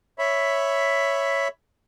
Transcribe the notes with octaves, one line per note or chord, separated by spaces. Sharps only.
C#5 E5 B5